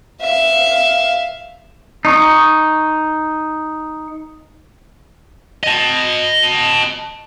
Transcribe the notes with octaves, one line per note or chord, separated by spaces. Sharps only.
E5 F5
D#4 C#6
D#5 A5